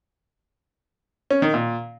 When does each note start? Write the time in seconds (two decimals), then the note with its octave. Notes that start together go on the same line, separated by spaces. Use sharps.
1.30 C#4
1.42 D#3
1.54 A#2